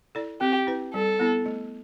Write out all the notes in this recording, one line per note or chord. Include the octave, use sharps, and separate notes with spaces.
E4 A4 D5
C4 G4
E4 B4
G3 A4
B3 E4
A3